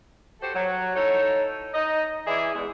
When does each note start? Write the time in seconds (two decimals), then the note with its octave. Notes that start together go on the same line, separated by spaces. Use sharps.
0.41 F#4 G4 A4 C5
0.54 F#3
0.95 D#4 E4 A4 C#5
1.74 D#4 D#5
2.26 E3 E4 G#4 D5 E5
2.54 E2 G#3